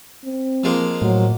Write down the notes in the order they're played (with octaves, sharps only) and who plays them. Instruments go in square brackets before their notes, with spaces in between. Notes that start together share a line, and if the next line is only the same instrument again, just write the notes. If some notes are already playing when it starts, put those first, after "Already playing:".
[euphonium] C4
[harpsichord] F3 G#3 A#3
[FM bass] A2 [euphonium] F#3